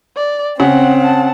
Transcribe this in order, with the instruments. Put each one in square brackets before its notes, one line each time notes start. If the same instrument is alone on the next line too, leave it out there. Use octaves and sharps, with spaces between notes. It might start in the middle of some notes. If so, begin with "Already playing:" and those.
[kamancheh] D5
[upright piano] C#3 [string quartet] C4 [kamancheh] F#5
[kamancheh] F#5 A5